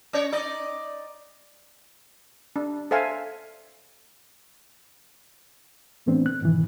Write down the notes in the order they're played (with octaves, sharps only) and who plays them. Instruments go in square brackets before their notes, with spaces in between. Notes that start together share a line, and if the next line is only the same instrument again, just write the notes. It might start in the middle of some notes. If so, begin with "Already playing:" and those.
[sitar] C#4 C#5
D#4 D5 D#5
[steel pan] D4
A4 C5 E5 F5 G#5
[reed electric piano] A2 E3 A3 B3 C4 D4
F#6
G#2 B2 D#3 E3